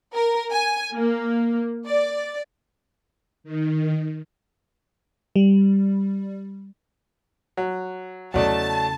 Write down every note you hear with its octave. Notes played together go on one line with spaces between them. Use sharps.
A#4
G#5
A#3
D5
D#3
G3
F#3
E2 C#3 F#3 A3 F#4 D5 D#5 A5